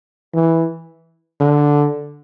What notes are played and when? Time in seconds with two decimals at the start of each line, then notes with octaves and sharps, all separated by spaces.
0.34 E3
1.40 D3